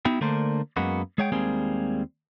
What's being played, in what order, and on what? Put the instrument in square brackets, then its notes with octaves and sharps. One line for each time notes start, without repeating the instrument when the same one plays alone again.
[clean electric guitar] B3 D#4 E4 F#4 G5
D3 A3 A#3 D4 A#4 C5
F#2 G#3 A#3 B3 F#4
G#3 G#4 C#5 F#5 G5
D#2 G3 G#3 A#3 C4 G#4